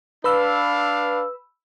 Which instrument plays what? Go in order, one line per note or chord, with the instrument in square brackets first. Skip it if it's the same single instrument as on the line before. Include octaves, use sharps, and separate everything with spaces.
[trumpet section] D4 F5 [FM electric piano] B4 B5 E6